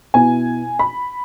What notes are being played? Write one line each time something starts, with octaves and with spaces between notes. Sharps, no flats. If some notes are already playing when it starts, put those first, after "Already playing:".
B2 B3 E4 G#5
B5